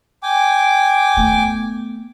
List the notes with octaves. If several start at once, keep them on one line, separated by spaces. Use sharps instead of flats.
G5 G#5 D6
A3 B3